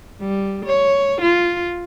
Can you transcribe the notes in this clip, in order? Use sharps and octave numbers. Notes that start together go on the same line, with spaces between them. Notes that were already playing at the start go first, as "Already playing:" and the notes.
G3
C#5
F4